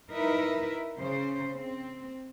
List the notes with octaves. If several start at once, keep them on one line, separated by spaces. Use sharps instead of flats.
D#4 E4 A#4 B4 E5
C#3 C5
C4